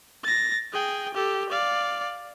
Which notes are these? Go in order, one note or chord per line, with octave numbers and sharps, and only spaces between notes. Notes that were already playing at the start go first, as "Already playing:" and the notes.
A6 A#6
G#4 G5
G4 A4
D5 F5